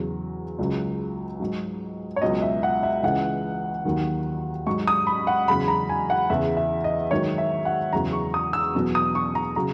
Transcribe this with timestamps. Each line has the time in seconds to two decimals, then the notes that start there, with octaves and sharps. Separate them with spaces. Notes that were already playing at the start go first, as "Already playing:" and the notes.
Already playing: E2 C#3 F#3
0.59 C#2 C#3 F#3
1.40 G#2 F#3
2.16 C#5
2.22 C#2 B2 F#3 D#5
2.42 E5
2.63 F#5
2.83 E5
3.03 C#2 C#3 E3 F#5
3.85 D#2 D#3 F#3
4.67 G#2 F#3 C#6
4.87 D#6
5.07 B5
5.27 F#5
5.48 E2 C#3 F#3 B5
5.68 A#5
5.89 G#5
6.10 F#5
6.30 E2 C#3 E3 E5
6.57 E5
6.84 D#5
7.11 G#2 D#3 F#3 C#5
7.38 E5
7.65 F#5
7.93 E2 C#3 F#3 A#5
8.13 C#6
8.34 D#6
8.53 E6
8.75 E2 B2 F#3
8.95 D#6
9.15 C#6
9.35 A#5
9.56 C#3 F#3 A#5